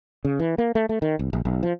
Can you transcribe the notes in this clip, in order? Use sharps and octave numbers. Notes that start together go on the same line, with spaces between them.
C#3
E3
A#3
A3
A3
D#3
C2
A#1
B1
F3